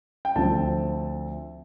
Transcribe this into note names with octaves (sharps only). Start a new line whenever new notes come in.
G5
D2 D3 F3 C4 A5